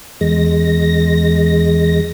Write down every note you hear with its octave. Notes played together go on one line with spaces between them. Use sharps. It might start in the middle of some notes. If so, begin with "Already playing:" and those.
E2 G#3 A#6